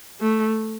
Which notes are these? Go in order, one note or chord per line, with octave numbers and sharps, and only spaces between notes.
A3